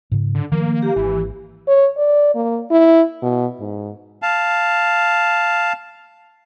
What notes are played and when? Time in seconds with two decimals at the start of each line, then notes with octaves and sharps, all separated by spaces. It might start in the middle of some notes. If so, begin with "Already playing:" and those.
0.12 G#2 C#3
0.35 D3
0.52 D#3 F3 A3 A#3
0.82 G4
0.96 G#1 E3
1.68 C#5
1.97 D5
2.35 A#3
2.71 E4
3.22 B2
3.60 G#2
4.22 F5 A5